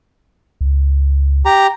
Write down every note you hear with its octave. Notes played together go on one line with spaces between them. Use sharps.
C#2
G4 A#5